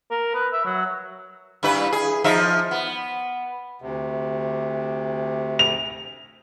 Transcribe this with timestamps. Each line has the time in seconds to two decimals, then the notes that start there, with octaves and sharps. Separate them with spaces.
0.10 A#4
0.34 B4
0.52 E5
0.65 F#3
1.63 G2 E4 B4
1.92 G#4
2.24 F3 D#4 E5
2.71 B3
3.82 D2 C3
5.59 F7